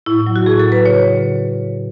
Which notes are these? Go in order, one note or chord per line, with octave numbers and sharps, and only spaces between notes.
A2 E4
F#3
F#4
A2 G#4
A4
F#3
B4
C#3 C#5